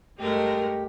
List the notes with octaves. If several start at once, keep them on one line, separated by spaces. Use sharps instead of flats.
G2 G#3 A3 G4 A#4